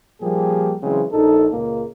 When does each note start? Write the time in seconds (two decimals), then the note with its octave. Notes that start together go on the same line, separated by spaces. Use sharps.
0.22 A#2 F3 G3 A#3 G4 G#4
0.82 C#3 E3 F#3 G#3 C4
1.12 A#1 D#4 A4
1.52 C#2 A#2 A#3